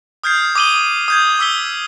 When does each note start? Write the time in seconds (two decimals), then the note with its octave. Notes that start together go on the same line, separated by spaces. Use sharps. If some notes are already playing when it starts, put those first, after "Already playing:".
0.24 D#6 F6 G6 G#6 C7
0.55 D6 D#6 D#7 F#7 G7
1.08 D#6 G6 G#6
1.39 D6 E6 B6 G7